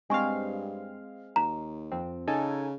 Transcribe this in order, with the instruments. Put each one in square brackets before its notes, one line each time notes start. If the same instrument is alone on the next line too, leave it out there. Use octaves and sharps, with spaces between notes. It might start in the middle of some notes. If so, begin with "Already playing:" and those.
[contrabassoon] G2 [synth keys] G#3 C4 F5 [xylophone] G#5 C#6
[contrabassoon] D#2 [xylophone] A#5
[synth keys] F2 C4
[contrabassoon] C#3 [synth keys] D#4 A4 G#5